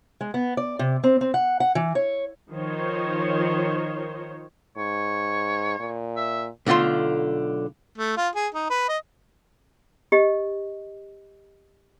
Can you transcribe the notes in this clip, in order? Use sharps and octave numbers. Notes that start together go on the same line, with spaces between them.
G#3
B3
D5
C3
C4
C4
F#5
F#5
E3
C#5
D#3 F3 D#4 C5 C#5
G#2 C#5
A#2
E5
B1 D3 A3 F4 C6
A3
F4
G#4
D#4
B4
D#5
G4 D#5